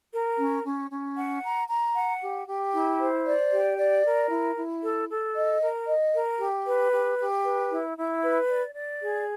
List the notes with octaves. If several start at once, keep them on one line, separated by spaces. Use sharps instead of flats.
A#4
C#4
C#4
C#4
F#5
A#5
A#5
F#5
G4
G4
E4
C5
D5
G4
D5
A#4
E4
E4
A4
A4
D#5
A#4
D#5
A#4
G4
B4
G4
G4
B4
E4
E4
B4
D5
D5
G#4